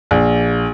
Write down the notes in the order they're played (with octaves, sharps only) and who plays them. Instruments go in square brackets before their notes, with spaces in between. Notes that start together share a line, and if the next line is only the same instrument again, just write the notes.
[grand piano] A#1